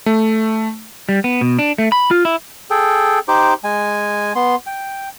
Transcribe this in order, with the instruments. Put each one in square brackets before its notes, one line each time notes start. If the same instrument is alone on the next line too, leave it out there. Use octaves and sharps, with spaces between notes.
[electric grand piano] A3
[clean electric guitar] G3
B3
B2
D4
A3
B5
F4
E4
[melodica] G#4 A4 G5
D#4 G4 C5 D6
G#3 G#5
B3 C6
G5